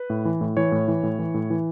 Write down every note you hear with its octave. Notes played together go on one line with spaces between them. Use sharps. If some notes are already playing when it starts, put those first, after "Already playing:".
Already playing: B4
A2
E3
A2
E3 C#5
A2
E3
A2
E3
A2
E3